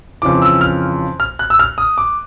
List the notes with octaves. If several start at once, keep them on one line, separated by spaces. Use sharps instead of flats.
F2 C#3 E3 D6
E6
F6
F6
F#6
E6
F6
D#6
D6